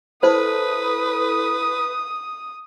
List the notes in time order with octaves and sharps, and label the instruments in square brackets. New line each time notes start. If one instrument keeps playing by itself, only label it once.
[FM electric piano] E4 A4 [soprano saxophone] B4 [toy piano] C5 [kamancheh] D#6